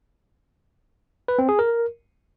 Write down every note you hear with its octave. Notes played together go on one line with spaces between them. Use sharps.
B4
C4
G#4
A#4